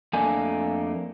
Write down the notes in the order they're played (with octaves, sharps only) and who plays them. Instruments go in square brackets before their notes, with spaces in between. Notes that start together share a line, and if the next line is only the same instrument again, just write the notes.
[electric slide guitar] F2 A3 A#3 D4 G#5